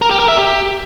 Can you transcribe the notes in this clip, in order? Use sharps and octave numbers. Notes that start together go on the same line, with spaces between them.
A#4
G4
A#4
E5
G4